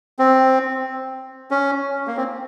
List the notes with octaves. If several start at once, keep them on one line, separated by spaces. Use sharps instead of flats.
C4
C#4
A#3
C4